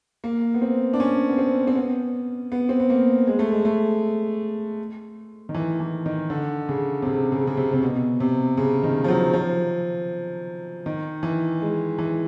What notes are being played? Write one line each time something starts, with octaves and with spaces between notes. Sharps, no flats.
A#3
B3
C4
D4
C#4
B3
C4
C4
B3
B3
C4
B3
A#3
G#3
A3
G#3
A3
D#3
E3
E3
D#3
D3
C#3
C3
C#3
C#3
C#3
C3
C3
B2
C3
C#3
D#3
F3
F#3
F3
D#3
E3
G#3
E3